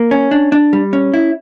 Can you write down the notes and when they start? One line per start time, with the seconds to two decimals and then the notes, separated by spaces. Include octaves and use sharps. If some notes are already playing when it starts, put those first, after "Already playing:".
Already playing: A#3
0.11 C#4
0.31 D4
0.52 D4
0.73 G3
0.93 C#4
1.14 E4